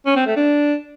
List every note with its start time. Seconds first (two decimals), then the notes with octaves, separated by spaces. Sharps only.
0.06 C#4
0.16 C4
0.26 A3
0.37 D4